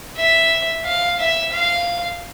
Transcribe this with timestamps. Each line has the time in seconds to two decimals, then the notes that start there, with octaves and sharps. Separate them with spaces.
0.16 E5
0.85 F5
1.19 E5
1.52 F5